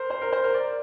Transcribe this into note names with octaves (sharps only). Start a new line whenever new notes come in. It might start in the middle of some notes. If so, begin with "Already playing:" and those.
Already playing: A#4 C5
C5
A#4
C5
A#4
D5